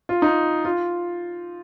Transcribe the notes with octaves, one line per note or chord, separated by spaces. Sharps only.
F4
D#4
F4